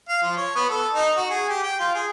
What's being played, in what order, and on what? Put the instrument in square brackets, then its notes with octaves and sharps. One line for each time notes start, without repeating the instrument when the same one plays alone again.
[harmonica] F5
F3
C#5
B3
A4
D#4
F#4
G#4
G4
G5
F4
G#4